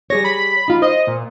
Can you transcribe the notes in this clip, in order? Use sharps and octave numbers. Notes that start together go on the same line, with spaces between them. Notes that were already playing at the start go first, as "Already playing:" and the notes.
G3 G#4 C#5 A#6
B5
D#4 F4
C5 D#5
A#2